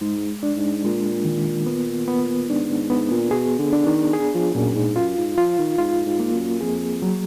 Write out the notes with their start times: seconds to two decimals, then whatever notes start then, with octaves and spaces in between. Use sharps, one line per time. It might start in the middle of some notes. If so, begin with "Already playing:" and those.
0.01 G#2 G#3
0.43 D4
0.56 G#2
0.84 A#2 G#3
1.25 D#3
1.66 B3
2.08 B3
2.49 G#2 D4
2.70 G#2
2.90 G#2 B3
3.11 A#2
3.31 B2 G#4
3.59 D3
3.73 D4
3.86 D#3
4.13 G#4
4.34 F3
4.55 F#2 A#2
4.75 G#2
4.96 F#2 F4
5.17 G#2
5.37 F3 F4
5.58 D#3
5.78 G#2 F4
6.06 G#2
6.20 A#3
6.34 F#2
6.61 F2 G#4
7.02 F#3